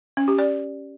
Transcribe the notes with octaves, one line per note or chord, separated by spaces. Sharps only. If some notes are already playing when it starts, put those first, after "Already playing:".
C#4
G4
D5